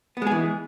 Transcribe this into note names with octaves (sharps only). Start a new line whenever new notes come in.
E3 G#3 B3 G#4